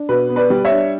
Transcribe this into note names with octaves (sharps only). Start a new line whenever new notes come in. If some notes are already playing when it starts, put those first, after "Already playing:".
Already playing: D4
B2 B4
B3
B4 D5
G3
C#5 E5
D4